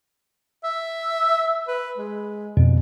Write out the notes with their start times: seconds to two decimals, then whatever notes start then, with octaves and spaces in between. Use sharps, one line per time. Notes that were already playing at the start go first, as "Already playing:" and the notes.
0.64 E5
1.68 B4
1.98 G#3
2.57 F2 B2